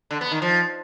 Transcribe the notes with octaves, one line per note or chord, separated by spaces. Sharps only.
D3
B3
D#3
F3